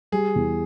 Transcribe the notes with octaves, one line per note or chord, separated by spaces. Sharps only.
G3 G#4
E2